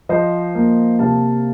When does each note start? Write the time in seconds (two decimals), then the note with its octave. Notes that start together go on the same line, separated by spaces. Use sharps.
0.09 F3 C5 D#5
0.55 A#3
0.99 C3 F5 A5